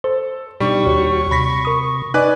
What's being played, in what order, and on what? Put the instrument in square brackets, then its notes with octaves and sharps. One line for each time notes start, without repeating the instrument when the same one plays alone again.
[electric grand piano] A4 [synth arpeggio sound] C5
[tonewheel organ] B2 D4 D#4 [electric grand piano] G3 [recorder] C#6
[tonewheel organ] D#2 F#4 C#5
[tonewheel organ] C3 [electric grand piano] B5 A#6 B6
[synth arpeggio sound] A#4 D#6
[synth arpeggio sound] D#4 D6 [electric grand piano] B4 G#5 F#6 [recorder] D5 [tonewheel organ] D#5